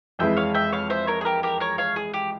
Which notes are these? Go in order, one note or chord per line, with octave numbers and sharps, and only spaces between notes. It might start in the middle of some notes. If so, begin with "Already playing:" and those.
F2 E3 G#3 E4 E5 G5
C#5 F5
E5 G5
C#5 F5
C5 E5
A#4 C#5
G#4
G4 A#4
G4 A#4
A#4 C#5
C#5 F5
G#4
G4